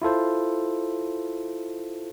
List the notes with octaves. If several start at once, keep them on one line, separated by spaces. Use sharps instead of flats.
E4 F4 A4 C5